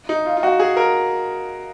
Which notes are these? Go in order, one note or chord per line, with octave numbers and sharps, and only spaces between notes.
D#4
F4
F4
F#4
G#4
A#4